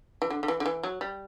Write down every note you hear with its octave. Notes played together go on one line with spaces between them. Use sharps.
E3
D3
D3
E3
D3
E3
F#3
G3